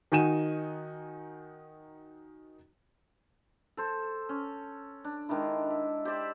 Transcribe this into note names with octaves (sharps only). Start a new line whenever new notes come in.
D#3 D#4 F#4 G#5 D#7 E7
A4 C5
C#4
D4
D#3 G#3 D4 E4
E5
G4 C5 D5 E5